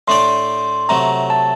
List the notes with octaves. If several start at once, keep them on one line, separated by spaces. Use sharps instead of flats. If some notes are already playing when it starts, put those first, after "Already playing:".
A2 A3 D4 G4 D5 C6
C3 F#3 A3 A#5
A5